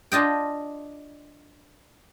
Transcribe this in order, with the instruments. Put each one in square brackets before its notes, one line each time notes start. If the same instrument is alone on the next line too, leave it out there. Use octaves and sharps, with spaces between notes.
[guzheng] D4 F4 D#5 G5